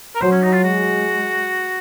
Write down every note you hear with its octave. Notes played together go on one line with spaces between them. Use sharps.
A#4
F#3 C5
C#4
D#4
F4
G#3 F#4